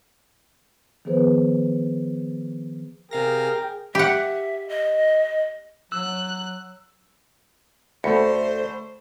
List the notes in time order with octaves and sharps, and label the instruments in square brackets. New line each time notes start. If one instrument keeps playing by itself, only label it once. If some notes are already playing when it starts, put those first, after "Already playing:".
[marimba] D#3 F3 B3 G#4 B4 C5
[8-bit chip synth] C3 F5 A#6 [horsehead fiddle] G#4 [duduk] A#4 [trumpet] G5
[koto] G4 F#5 [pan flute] E5
[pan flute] D#5
[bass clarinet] F#3 [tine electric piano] E6 [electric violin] F#6
[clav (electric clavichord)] D2 [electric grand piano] A3 B5 C#7 [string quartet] C5